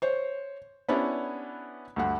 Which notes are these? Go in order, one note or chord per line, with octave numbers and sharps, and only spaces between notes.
C5 C#5
B3 C#4 D4 E4 G4 C#5
D2 G2 F#5